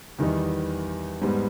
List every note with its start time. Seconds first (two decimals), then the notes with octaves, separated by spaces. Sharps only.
0.19 E2 D#3 G3 B3 D#4
1.22 G#2 G3 B3